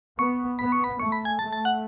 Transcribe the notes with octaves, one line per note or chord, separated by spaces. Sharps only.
B3 C#6
B3 B5
C#6
B5
A3 C#6
B5
G#5
A3 A5
A5
F#5